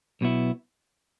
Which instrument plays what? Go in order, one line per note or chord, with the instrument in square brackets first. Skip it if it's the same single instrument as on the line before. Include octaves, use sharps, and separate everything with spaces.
[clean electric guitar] B1 B2 B3 E4